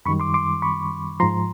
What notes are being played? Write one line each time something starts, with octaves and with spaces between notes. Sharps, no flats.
F#2 D#3 G3 B5 C#6
C6 D6
C6 D6
B5 C#6
G#2 F3 A#5 C6